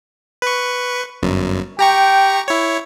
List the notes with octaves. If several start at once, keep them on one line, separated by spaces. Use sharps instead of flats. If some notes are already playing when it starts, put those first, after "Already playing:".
B4 C#6
G1 F#2
G4 G5 A#5 C#6
E4 C#5